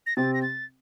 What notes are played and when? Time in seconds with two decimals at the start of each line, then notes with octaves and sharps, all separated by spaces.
0.06 A#6
0.17 C3 C4 A6
0.34 A#6
0.42 A6